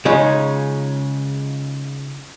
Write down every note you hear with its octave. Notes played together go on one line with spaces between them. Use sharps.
C#3 G#3 C#4 D#4 F4